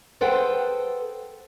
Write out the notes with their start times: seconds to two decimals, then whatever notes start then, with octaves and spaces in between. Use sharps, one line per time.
0.21 G#4 A4 B4 C5 F#5 G5